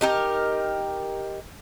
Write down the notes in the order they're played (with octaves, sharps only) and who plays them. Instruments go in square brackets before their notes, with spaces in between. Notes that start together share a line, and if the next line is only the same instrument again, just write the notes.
[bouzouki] D#4 G4 A#4